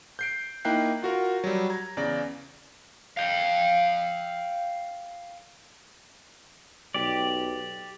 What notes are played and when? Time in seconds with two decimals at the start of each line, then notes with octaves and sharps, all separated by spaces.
0.19 G6 C7 D7
0.65 A#3 D#4 E4 G5 F#6 C7
1.02 F4 F#4 A#4
1.44 F#3 G3
1.70 A#5 G#6
1.97 E2 C#3 D5 A#6
3.17 F5 G5
6.94 B1 G4 D5